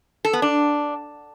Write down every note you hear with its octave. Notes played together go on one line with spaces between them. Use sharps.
A4
B3
D4